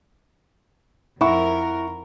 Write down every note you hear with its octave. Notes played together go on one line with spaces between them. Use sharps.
F2 E4 A#4 F#5 C#6